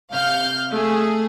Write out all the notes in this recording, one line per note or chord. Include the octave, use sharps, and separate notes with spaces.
C3 F5 F6 G6
A3 G#4